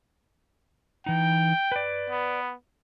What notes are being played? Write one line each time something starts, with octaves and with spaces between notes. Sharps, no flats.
E3 D#4 G5
B4 D5
B3